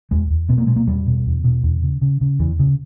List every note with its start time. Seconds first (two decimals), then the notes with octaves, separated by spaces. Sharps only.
0.11 E2 G#3
0.30 E2
0.49 B2 B3
0.58 A#3
0.67 B2 G#3
0.76 A#3
0.87 E2 G3
1.06 B2
1.26 E2
1.44 B2
1.63 E2
1.83 C#3
2.01 C#3
2.21 C#3
2.39 E2 E3
2.59 C#3